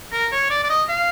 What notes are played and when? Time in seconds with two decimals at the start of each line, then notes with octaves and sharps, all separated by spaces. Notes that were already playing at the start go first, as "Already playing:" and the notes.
0.13 A#4
0.32 C#5
0.51 D5
0.64 D5
0.70 D#5
0.89 F5